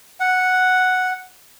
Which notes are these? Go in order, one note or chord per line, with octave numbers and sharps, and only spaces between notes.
F#5